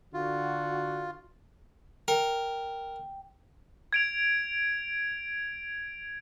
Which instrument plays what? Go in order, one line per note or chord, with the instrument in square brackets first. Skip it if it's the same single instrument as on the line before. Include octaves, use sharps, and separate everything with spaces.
[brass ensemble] D3 F#4 [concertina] F4
[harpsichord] A#4 [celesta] G5
[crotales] G#6 D7 F7